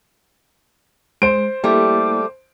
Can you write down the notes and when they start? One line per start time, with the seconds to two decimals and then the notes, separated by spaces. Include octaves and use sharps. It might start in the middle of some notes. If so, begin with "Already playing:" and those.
1.22 G#3 C5 D7
1.64 G3 A3 A#3 E4 G4 D6